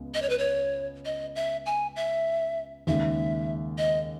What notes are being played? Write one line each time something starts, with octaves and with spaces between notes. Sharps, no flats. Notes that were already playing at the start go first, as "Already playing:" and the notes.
Already playing: C#2 B3
D#5
C#5
B4
C#5
D#5
E5
G#5
E5
D#2 C#3 G#3 E5
D#5